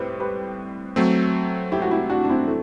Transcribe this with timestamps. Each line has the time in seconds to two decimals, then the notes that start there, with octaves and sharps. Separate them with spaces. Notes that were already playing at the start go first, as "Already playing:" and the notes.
Already playing: A2 G3 C4 G4 B4 C5
0.20 G4 B4
0.96 F#3 A3 C4
1.72 E4 G4
1.82 F#4
1.91 E4 G4
2.10 D4 F#4
2.24 D4
2.29 C4 E4
2.47 A3